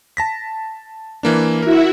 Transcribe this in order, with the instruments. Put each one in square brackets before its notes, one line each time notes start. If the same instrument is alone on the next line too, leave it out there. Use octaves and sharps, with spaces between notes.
[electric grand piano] A5 A#6 B6
E3 A#3 D4
[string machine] E4 F#4 E5 [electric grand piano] A#4